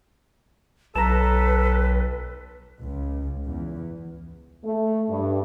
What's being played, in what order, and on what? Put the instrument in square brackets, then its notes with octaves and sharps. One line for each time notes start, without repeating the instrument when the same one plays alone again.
[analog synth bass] B1 [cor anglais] A4 [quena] B4 [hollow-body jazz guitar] A5 A#5
[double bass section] C#2
E2
[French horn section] A3
G2